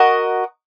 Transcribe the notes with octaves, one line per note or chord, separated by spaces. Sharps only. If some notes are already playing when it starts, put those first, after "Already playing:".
Already playing: F#4 A#4 D#5